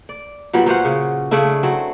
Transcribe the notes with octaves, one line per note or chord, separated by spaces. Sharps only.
D5
A#2 F#3 G3 B3
F#3 C#4 C5 F#5
C#3
C#3 A3 D4 E4
F#3 C4